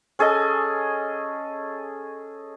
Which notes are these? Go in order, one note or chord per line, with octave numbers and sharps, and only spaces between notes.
C#4 G#4 A4 D#5